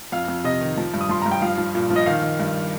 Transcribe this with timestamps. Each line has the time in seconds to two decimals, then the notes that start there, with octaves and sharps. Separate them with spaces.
0.12 F2 F5
0.28 F2
0.44 C3 D#5
0.61 D#3
0.77 F3
0.94 G2
1.01 D#6
1.09 F3 C6
1.22 G2 A#5
1.31 G5
1.42 F3 F5
1.58 F3
1.75 A#2
1.90 F3
1.96 D#5
2.06 D#3 F5
2.22 D#3
2.40 G2